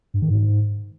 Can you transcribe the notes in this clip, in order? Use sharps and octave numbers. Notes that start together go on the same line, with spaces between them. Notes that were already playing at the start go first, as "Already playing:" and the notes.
G2
D#3
G#2